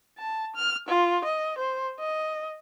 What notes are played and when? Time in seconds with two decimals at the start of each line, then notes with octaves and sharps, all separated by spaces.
0.18 A5
0.56 F6
0.88 F4
1.24 D#5
1.58 C5
2.00 D#5